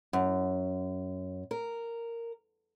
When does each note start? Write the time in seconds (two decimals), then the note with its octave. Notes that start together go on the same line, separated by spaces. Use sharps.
0.13 F#2
1.51 A#4